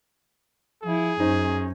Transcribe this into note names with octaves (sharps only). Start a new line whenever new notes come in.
F3 E4 G#4
F#2 C#4 D#4 C5